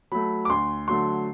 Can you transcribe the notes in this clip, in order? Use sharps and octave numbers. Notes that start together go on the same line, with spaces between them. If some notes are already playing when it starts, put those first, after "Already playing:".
F#3 A3 B5
D6
D2 C6
D3 F#3 A3 C6